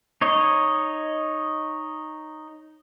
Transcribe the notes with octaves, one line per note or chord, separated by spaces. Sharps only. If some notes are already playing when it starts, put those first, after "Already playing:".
D#4 C#5 D#5